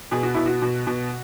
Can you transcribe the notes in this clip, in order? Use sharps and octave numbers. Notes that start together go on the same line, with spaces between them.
B2 G#4
F#4
B2 E4
F#4
B2
B2